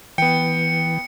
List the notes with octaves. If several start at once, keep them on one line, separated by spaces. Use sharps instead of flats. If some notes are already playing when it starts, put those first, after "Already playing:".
E3 B3 G5 C#7